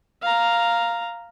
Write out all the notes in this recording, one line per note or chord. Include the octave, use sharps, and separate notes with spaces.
F5 A#5